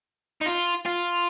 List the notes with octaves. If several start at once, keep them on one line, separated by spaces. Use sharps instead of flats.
D#4
F4
F4